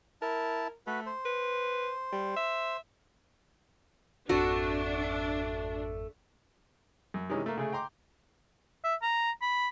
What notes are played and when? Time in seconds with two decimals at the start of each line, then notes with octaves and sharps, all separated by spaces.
0.22 E4 A#4 A5
0.87 A3 F#4 B4
1.06 C5
1.25 B4
2.12 G3
2.36 E5
4.29 G#1 F2 A3 C4 D4 F#4
7.14 F#2
7.29 C3 D#3 E3 G#3 C#4 D#4
7.46 A3 A#3
7.58 C#3 A3 G#4
7.72 G5 A#5 C6 D6
8.84 E5
9.02 A#5
9.42 B5